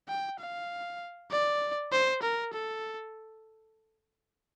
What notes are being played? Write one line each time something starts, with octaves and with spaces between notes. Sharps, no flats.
G5
F5
D5
C5
A#4
A4